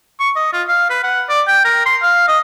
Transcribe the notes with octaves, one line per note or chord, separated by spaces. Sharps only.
C#6
D#5
F4
F5
B4
F#5
D5
G5
A#4
C6
F5
D#5